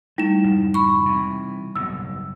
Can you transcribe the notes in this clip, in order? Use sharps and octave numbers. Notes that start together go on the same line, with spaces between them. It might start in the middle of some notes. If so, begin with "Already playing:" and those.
G3 A3 D#4 E4 E7
F2 G#2 C#3
B5 C#6
C3 E3
F#1 B1 G#2 E6